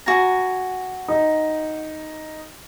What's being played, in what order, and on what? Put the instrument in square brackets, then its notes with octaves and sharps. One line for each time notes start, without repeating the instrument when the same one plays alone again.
[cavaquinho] F#4 G#5 A#5
[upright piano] D#4